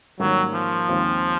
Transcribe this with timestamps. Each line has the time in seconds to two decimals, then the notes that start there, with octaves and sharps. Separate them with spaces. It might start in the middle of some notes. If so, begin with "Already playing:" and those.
0.20 G#2 D#3 F#3 G3 A#3 C#4
0.54 F3
0.88 D#2 D#3 G#3 C4 F4